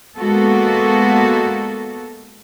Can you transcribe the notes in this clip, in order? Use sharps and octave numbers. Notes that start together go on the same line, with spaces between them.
G#3 A#3 B3 F#4 A4